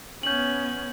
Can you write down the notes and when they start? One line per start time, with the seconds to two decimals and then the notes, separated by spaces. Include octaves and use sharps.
0.23 B3 C#4 G6 F#7